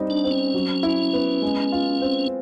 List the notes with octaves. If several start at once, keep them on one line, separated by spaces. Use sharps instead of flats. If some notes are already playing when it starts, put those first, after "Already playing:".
Already playing: G3 C4 D#4
D4
C4
C#4
F#3
E4
B3
G#3
F4
C4